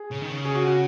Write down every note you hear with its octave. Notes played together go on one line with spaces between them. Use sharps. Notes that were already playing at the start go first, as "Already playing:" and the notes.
Already playing: G#4
C#3
D#3
C#3
G#4
F#4
F#4